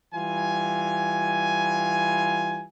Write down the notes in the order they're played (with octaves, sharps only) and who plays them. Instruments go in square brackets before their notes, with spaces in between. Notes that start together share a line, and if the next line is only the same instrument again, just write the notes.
[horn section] E3 G3 F4 G#5